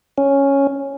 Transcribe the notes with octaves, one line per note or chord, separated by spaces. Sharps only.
C#4